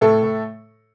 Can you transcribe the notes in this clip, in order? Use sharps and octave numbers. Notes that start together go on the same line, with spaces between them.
A2 A3 A4
A2